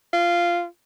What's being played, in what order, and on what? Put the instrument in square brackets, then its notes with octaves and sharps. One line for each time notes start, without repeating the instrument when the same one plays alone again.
[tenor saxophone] F4